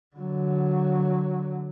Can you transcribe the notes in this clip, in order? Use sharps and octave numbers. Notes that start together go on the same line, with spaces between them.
D3 F#3